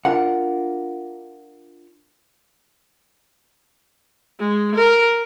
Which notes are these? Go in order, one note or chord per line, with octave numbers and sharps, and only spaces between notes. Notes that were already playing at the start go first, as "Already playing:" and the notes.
D4 F4 A#4 F#5
G#3
A#4